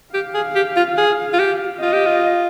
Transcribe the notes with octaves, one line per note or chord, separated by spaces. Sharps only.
G4 F5
G#4
G4
F4
G#4
F4
G4
F4 D#5
G4
F4